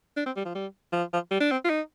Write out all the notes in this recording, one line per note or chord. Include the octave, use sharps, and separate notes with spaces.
D4
C4
G3
F3
G3
F3
F3
G3
D4
C4
F4
D#4